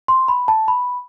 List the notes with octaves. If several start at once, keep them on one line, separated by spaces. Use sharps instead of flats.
C6
B5
A5
B5